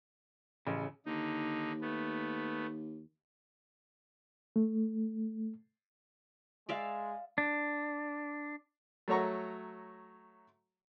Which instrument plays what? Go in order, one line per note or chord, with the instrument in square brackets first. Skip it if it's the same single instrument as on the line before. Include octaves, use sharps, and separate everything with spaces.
[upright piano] A1 [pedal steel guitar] C#3
[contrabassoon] D#2 [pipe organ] D3 D#4
[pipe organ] A3 B3
[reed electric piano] A3
[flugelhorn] G#3 [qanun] D5 E5 F5
[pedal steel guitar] D4
[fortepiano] F#3 A3 C#5 A#5 C#6